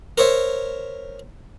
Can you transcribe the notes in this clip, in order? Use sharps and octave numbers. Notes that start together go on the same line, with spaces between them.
A#4 C5 C#5 E5